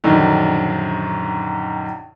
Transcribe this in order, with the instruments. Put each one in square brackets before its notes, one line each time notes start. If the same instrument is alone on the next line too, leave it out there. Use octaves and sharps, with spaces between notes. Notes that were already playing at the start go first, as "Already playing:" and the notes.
[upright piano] A#1 F#2 D3 D#3